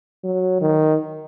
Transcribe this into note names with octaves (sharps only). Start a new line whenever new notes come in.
F#3
D#3